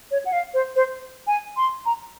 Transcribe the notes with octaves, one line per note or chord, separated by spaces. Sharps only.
C#5
F#5
F5
C5
C5
G#5
C6
A#5